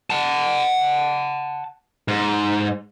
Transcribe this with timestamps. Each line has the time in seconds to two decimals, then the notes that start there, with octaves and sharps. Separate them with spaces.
0.10 F#5 A5
2.08 G#2